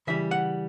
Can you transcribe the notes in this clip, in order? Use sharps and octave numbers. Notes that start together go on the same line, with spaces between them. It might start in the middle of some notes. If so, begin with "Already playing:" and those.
C#3 E3 G3 E5
F#5